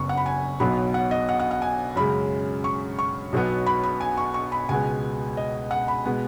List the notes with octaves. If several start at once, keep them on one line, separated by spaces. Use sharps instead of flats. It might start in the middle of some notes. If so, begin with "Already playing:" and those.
Already playing: F#1 F#2 F#3 B3 C#6
F#5
B5
G#5
B1 B2 F#3 B3 B5
F#5
D#5
F#5
F#5
F#5
G#5
F#2 C#3 G#3 B5
C#6
C#6
B1 B2 F#3 B3
B5
B5
G#5
C#6
C#6
B5
C#2 B2 G#3 B3 G#5
D#5
F#5
B5
B2 G#3 B3